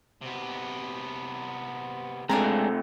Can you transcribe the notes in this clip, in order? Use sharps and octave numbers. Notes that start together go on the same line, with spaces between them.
C3 B3
C3 G#3 A3 D4 F5 G#5 A#5